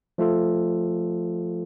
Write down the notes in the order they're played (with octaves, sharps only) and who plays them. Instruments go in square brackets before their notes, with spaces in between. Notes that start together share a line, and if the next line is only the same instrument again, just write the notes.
[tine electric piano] F3 A3 F4 A4